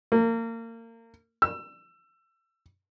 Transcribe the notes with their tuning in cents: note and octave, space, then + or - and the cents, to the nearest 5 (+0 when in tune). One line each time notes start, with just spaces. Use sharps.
A#3 -30
E6 +25